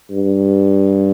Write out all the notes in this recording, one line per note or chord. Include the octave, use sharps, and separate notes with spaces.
G2